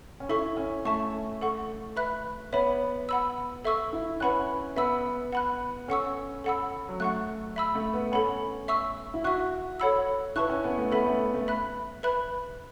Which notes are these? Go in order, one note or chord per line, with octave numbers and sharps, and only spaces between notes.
C#4
E4 A4 E5 C#6
C#4
A3 E5 A5 C#6
A4 F#5 C#6
B4 E5 B5 F#6
B3 C#5 E5 B5
F#5 B5 E6
A4 E5 C#6 E6
E4
C#4 B4 F#5 B5 F#6
B3 E5 B5 E6
F#5 B5 F#6
C#4 A4 F#5 C#6 E6
A4 F#5 B5 E6
F#3
A3 F#5 C#6 F#6
E5 B5 E6
A3
B3
C#4 A4 F#5 B5
E5 C#6 E6
E4
F#4 E5 C#6 F#6
A4 C#5 F#5 B5 E6
E4 B4 A5 C#6 F#6
C#4
B3
A3
B3 A4 E5 B5
A3
A3
E5 B5 F#6
B4 E5 B5 F#6